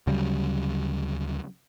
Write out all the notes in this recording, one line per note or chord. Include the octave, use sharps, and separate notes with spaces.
D2 C#3 F#3 G3